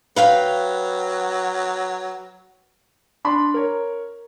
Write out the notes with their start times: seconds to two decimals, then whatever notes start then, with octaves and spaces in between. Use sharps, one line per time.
0.16 F#3 B4 F5 G5
3.25 D4 B5 C6
3.54 A#4 C#5